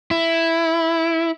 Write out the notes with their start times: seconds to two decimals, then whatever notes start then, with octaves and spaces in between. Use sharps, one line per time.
0.11 E4